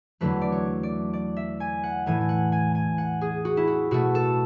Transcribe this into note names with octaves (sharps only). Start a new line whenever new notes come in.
E2 D3 F#3 A3 B4
D5
C#5
D5
D5
E5
G#5
F#5
A2 E3 A3 G#5
G#5
F#5
G#5
G#5
F#5
G#4
F#4
E4
F#4
B2 A3 F#4
A4